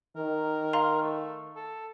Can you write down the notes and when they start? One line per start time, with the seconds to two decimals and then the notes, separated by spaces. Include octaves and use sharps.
0.16 D#3 A#4
0.73 F5 A#5 C6
1.02 A3
1.56 A4